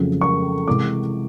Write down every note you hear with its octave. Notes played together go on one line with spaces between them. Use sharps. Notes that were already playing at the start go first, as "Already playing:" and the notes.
Already playing: F2 C#3 F#3 A3
C#6
C3 E3 G#3 D6